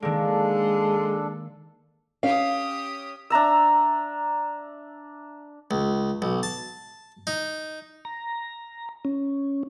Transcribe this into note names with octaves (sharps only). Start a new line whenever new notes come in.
D#3 G#3 A#3 D4 A4
C#4 G4 F5 D#6
D4 E5 A#5 E6
C#2
B1
A5
D#4
A#5
C#4